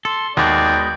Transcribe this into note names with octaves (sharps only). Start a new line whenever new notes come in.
A4 C6
D#2 G#3 B3 F#4 D5 G6